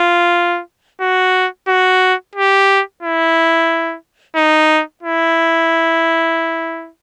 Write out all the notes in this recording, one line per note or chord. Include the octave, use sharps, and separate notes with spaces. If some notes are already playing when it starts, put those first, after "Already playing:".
Already playing: F4
F#4
F#4
G4
E4
D#4
E4